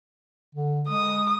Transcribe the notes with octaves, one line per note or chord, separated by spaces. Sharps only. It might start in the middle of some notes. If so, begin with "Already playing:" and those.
D3
G#3 D#6